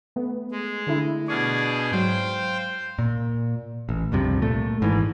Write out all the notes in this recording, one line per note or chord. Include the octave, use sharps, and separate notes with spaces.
A3 B3
G#3
D3 A3 E4
B2 D4 G#4 C#6 F6 G#6
G#2 F#3 C5 F5 G5
A#2
A1
C#2 G2 C3 F3
A#2 A3
G#1 G#2 E3